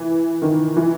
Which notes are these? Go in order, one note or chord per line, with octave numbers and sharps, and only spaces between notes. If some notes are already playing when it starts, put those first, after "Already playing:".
Already playing: E3
D#3
E3